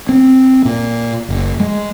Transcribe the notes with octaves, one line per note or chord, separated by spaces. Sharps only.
C4
A#2
F#1
G#3